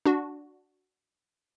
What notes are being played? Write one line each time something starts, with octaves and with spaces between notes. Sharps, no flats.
D4 F#4